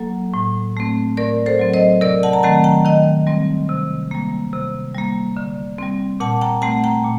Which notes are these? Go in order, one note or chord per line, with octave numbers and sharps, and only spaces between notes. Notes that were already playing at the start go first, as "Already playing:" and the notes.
Already playing: F#3 A#3 A4
A2
A3 C4
A2 A#4 D5
A4 C5
F#3 C4
C5 D#5
C3 A#4 D5
F#5 A5
A#5
D#3 F#3 A3 C4 F#5 A5
G5 A#5
D#3 D#5 G5
G3 C4
C3
G3 A#3
C3
G3 A#3
D3
G3 C4
A#2 F#5 A5
G5 A#5
A3 C4 F#5 A5
G5 A#5
A#2